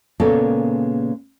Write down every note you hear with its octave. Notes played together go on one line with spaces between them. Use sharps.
A#2 C#3 G#3 A#3 B3 A4